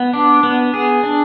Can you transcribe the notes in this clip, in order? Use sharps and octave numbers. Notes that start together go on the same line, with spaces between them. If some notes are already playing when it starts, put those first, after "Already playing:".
Already playing: B3
D4
B3
G#4
D4